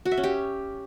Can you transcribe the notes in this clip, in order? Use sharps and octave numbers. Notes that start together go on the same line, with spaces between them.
F#4
E5
C#4
G4